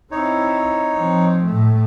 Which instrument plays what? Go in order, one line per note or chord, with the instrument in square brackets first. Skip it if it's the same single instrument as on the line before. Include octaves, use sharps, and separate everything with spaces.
[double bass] C4 E4 [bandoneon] D#4 C#5
[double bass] F3 C4
A2 A3